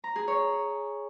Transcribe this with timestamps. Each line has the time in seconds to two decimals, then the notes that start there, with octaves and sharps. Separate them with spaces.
0.04 A#5
0.16 G#4
0.28 C#5